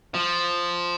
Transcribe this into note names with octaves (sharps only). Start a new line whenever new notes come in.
F3